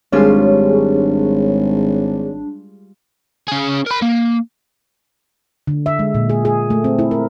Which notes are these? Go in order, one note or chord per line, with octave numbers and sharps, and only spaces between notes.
G#1 G3 G#3 D4 F4 G#4 C#5
C#4 G#4
A#4 B5
A#3
D3
E5
G#3
A#2
G#4
G#4
A3
C4
E4
A#4